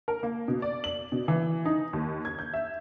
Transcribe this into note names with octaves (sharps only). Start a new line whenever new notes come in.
A#4
A#3
B2
D5
F#7
B2
E3
D#4
D#2
G#6
G6
E5